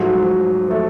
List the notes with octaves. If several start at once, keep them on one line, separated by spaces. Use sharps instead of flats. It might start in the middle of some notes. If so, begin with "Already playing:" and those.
Already playing: G#2 F3 F#3 A3
F3 A3